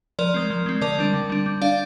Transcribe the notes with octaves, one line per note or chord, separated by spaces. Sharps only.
F3 A#4 D5
G#3 C4
F3
G#3 C4
D3 A#4 D5
G3 D4
D3
G3 D4
G3
D4 D5 F5